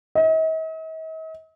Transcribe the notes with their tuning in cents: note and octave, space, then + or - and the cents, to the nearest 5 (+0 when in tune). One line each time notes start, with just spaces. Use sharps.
D#5 +45